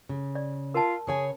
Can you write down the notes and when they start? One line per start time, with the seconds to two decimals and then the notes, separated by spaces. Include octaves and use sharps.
0.09 C#3
0.35 D5
0.74 F4 A#4 A5
1.07 C#3 G#4 C#5 G#5